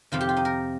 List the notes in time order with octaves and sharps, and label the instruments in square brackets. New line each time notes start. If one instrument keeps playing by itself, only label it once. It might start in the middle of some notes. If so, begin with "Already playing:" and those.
[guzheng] F2 C3 D#3 F4
G4
F4
D#4
A#4